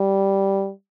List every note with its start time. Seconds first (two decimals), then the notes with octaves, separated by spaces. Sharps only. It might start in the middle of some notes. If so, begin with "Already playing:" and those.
Already playing: G3